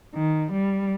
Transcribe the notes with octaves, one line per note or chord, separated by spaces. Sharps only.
D#3
G3